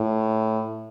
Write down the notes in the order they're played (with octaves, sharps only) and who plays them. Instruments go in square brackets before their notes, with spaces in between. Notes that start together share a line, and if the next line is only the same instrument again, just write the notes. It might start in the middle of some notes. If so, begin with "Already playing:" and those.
Already playing: [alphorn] A2